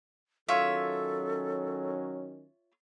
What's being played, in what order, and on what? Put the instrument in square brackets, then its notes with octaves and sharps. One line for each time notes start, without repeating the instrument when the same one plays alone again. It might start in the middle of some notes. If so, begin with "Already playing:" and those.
[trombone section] D#3 F#3 C#4 [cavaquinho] F4 C#5 E5 [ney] A4